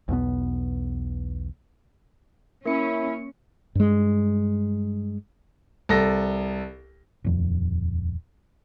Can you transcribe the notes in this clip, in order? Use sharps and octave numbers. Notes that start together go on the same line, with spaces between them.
B1 E2 B2 B3
A#3 C#4 E4 A#4 E5 C#7
G2 G#3
C2 A4 A#6
D#1 F2